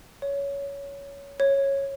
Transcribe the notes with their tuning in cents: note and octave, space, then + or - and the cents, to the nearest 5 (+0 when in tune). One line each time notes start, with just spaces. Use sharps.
C#5 +15
C#5 -10